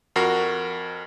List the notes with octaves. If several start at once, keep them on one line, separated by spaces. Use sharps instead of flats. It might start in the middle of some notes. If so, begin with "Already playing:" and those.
F2 F#4 A#4 C7